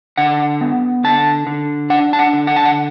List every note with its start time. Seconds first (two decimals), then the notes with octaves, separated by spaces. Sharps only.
0.17 D3 F#5
0.61 B3
1.04 D3 A5
1.47 D3
1.90 D4 F#5
2.13 A5
2.19 F#5
2.33 D3
2.47 F#5
2.56 A5
2.65 F#5